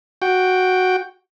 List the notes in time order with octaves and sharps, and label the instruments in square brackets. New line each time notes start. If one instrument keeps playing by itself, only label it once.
[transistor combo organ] F#4 G5